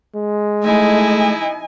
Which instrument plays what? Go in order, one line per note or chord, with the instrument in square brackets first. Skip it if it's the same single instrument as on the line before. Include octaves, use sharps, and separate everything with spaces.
[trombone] G#3
[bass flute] A3 [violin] D#4 E4 [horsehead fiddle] D#5 G#5